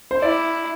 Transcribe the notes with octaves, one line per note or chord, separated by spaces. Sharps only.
C5
E4 D5